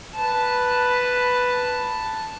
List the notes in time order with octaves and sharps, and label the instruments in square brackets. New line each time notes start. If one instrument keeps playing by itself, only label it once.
[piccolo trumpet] B4 [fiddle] A5